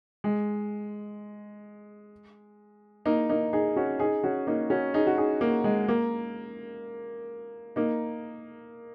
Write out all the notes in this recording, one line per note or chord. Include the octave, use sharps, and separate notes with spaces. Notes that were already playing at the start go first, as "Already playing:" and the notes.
G#3
A#3 D#4
A#3 D#4
D#4 G#4
C#4 F#4
D#4 G#4
C#4 F#4
A#3 D#4
C#4 F#4
D#4 G#4
F#4
D#4 G#4
A#3
G#3
A#3
A#3 D#4